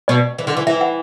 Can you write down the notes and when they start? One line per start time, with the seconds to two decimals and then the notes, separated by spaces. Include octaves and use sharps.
0.08 B2 D5
0.38 E3
0.47 D3
0.57 E3
0.67 E3 E5
0.81 F#5